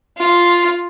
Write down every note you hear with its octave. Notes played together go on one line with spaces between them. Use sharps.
F4